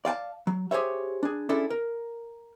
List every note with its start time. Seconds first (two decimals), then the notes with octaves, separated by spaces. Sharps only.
0.05 D5 F5 G5 A5
0.47 F#3
0.71 G4 G#4 C5 C#5 E5
1.23 D4 G#4
1.49 C#4 D4 E4 G#4 A4
1.70 A#4